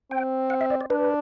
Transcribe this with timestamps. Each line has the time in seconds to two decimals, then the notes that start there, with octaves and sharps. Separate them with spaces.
0.11 C4 G5
0.50 F#5
0.61 E5
0.70 D5
0.81 D5
0.90 D4 B4